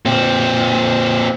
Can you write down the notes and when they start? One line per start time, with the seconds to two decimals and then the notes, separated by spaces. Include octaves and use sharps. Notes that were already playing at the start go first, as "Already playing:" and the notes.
0.06 A#2 C4